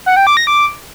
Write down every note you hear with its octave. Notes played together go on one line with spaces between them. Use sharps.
F#5
G5
D6
A#6
D6